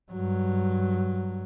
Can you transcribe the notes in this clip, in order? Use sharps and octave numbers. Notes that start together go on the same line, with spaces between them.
G2 F#3